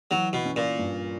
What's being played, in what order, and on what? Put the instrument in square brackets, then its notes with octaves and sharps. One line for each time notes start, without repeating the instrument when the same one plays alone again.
[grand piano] E3 [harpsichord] F#3
[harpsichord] B2
[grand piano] C#4
[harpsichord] A#2
[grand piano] G2